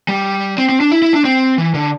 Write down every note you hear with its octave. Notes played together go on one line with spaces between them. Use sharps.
G3
C4
C4
D4
E4
E4
D4
C4
E3
D3